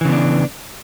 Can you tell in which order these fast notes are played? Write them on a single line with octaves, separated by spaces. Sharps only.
E3 C#3 B3 D4